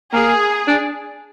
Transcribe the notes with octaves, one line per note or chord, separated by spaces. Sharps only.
A#3 G#4
D4